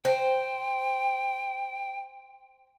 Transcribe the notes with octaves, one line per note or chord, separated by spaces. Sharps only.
C5 G5